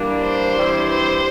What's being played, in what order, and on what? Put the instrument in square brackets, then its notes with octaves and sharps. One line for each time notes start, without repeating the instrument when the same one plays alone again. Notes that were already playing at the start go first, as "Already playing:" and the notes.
Already playing: [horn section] E3 G3 A#3 D4
[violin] C5
[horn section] G2 E3 G3 C4 E4
[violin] C5